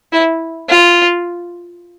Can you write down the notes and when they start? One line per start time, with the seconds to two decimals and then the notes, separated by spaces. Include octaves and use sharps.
0.12 E4
0.69 F4